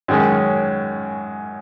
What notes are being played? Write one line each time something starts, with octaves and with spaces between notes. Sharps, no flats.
F#2 D#3 G#3 C#4